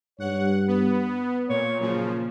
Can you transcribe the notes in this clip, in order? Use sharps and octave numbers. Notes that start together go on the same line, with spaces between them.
G2 C#5 F#5
B3 B4
A#2 A#3 C#5
A#2 C#3 F3 F#3